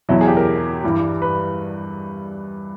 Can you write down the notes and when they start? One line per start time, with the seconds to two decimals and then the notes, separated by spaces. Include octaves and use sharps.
0.09 E2 B2 F#3 E4
0.21 G#4
0.28 G4
0.37 A#4
0.84 G2 E3 G3
1.22 B4